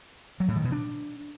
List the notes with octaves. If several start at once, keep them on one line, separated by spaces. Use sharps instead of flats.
F#3
A2
D#3
B2
D4